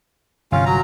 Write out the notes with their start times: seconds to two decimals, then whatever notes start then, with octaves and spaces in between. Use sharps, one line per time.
0.52 G1 C3 C#4 F4 F5
0.66 F#3 A#5